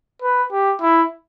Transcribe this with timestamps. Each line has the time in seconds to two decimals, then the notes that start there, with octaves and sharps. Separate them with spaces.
0.22 B4
0.52 G4
0.81 E4